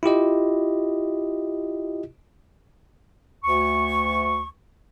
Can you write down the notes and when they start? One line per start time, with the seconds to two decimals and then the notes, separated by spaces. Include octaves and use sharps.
0.03 E4 F4 G4 D#5
3.44 D2 C#6